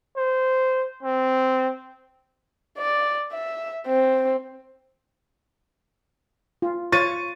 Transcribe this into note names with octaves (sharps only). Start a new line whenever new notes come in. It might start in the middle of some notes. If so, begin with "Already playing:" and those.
C5
C4
D5
E5
C4
F4
F4 C#5 C#6 A6 D#7